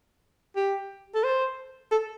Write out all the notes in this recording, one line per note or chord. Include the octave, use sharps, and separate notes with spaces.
G4
A4
C5
A4